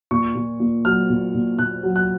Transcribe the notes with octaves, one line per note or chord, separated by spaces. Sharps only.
A#2 C#6
A#2
A#2
F#3 F6
A#2
A#2
A#2 F#6
F#3
F#6